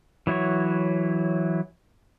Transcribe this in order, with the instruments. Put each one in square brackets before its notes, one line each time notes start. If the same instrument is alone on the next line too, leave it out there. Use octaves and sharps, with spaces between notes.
[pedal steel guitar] E3 F#3 E4 F#4 C#5